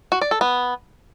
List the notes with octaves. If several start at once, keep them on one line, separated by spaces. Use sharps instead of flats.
F#4
D5
A4
B3